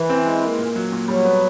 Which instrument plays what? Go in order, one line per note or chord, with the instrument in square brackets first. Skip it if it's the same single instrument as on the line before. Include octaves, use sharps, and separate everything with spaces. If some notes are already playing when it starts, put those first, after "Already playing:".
Already playing: [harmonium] E3
[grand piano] C4
G#3
A#3
A#2
F#3
A#2
[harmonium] F#3 [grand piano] G3
[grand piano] B3